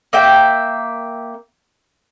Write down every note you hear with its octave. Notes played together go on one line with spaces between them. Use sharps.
A#3 E5 G5